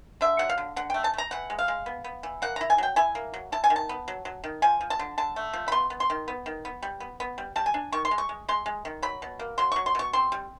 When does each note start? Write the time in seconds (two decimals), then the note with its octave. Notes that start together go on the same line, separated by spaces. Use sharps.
0.21 D3 E5
0.39 F#3 F#5
0.49 F5
0.58 D3
0.76 D3 F#5
0.90 A3 G5
1.04 A5
1.13 A3
1.18 A#5
1.31 E3 F#5
1.50 G#3
1.59 F5
1.68 G#3
1.86 B3
2.04 B3
2.23 E3
2.42 A#3 F#5
2.56 E4 A#5
2.70 G#5
2.78 F#3 G5
2.96 E4 G#5
3.15 A#3
3.34 F#3
3.52 E4 A5
3.64 G#5
3.70 D#3
3.76 A5
3.89 B3
4.08 F#3
4.25 F#3
4.44 D#3
4.62 F3 G#5
4.81 F3
4.90 A5
4.99 D3
5.18 D3 A5
5.36 A3
5.53 F3
5.68 B5
5.72 B3 C6
5.90 B3
6.00 C6
6.10 D#3
6.28 B3
6.46 D#3
6.65 B3
6.83 G3
7.00 B3
7.20 B3
7.38 G3
7.56 G3 A5
7.66 G#5
7.74 D4
7.92 D#3 C#6
8.05 C6
8.11 G#3
8.18 C#6
8.29 G#3
8.48 G#3 C6
8.66 G#3
8.85 D#3
9.02 F#3 B5
9.22 B2
9.39 A#3
9.58 F#3 C6
9.72 F#3 C#6
9.86 C6
9.95 B2 C#6
10.13 C4 C6
10.32 G3